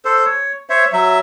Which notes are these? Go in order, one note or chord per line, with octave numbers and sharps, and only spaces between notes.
A4 C5
C#5
C5 C#5 E5
F#3 E5